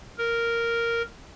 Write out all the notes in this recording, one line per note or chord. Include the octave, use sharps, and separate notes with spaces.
A#4